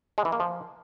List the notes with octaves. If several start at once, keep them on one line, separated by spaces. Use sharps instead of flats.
G#3
E3
A#3
F3